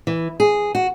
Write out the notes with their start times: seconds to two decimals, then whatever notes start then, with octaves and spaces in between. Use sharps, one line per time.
0.07 E3
0.40 G#4
0.75 F#4